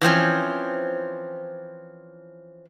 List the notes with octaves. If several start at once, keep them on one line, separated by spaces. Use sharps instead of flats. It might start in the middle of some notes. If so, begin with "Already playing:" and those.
E3 F3 C4 C#4